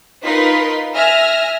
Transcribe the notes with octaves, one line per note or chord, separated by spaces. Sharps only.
D#4 F4 A#4 B4 C6 B6
E5 G#5 F6 A#6